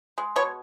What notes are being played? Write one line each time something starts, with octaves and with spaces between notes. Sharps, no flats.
G#3
B2 C#5